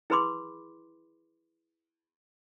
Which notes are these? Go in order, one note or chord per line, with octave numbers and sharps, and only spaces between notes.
E4 G#4 B4 B5 C6 D6